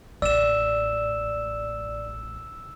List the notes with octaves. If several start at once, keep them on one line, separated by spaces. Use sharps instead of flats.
A1 D5 E6 E7